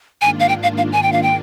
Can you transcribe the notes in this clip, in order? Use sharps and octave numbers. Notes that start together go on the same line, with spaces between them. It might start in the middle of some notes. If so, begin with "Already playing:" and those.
G#2 D#3 A#3 D4 F4 G#5
F5
G5
F5
F5
G#5
G5
F5
G5